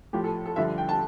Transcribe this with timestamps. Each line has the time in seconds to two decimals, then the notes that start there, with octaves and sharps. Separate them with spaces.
0.13 A2 F3 G4
0.24 A4
0.46 A4
0.56 G2 D3 F3 E5
0.78 G5
0.89 A5